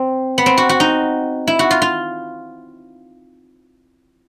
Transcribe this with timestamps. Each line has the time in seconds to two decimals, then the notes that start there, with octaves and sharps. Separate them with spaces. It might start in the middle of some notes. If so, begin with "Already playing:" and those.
Already playing: C4
0.38 B3
0.46 C4
0.58 F#4
0.69 F#4
0.80 D#4
1.47 E4
1.59 F#4
1.71 F4
1.82 F4